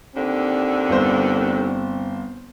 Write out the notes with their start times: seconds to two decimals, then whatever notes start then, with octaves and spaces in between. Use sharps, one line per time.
0.16 D#2 D3 C4
0.89 G1 C5